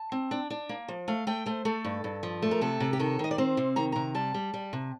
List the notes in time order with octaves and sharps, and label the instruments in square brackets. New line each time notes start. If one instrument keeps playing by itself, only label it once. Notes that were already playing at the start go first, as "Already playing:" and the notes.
Already playing: [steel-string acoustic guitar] A5
C4
D4
D4
A#3
F3
A3 F5
A3 G5
A3 C5
A3 A4
G2
G2
F3
A3
A#4
C3 A4
C3
G4
D#3 A4
D#3 D#5
D5
C4 C5
C3
D#3 A#5
C3 A#5
G3 A5
G3
G3
C3